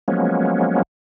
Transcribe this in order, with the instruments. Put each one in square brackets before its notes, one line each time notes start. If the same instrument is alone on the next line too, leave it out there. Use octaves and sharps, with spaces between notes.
[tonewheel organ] F3 F#3 G#3 A#3 B3 C#4